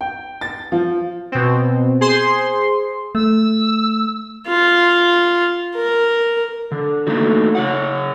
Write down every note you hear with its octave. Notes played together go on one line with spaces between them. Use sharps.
G5
A6
F3
B2 C4
G#4 C5 C6
A3 E6
F4
A#4
D3
A3 A#3 D#4 F#4
C#3 C#5 F#5